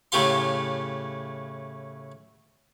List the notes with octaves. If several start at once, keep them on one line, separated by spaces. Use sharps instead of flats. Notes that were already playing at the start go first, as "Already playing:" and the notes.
A2 C#3 A3 G4 F5 C6